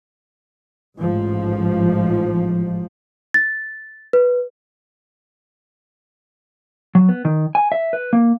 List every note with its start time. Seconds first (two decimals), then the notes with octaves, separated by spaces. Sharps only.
0.98 A1 G#2 F3
3.34 A6
4.13 B4
6.95 F#3
7.09 B3
7.25 D#3
7.55 G#5
7.72 E5
7.93 B4
8.13 A#3